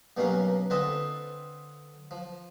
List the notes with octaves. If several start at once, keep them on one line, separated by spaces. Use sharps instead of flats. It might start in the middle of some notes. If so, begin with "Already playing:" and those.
G2 B2 F#3 A#3 C#4 F5
D3 C4 F4 B4 D#5 A5
F3